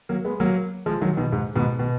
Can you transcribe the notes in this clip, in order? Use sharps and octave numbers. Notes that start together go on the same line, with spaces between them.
F#3 A#3
G#3 B3
F#3 A#3
F3 G#3
D#3 F#3
B2 D#3
G#2
G#2 B2
B2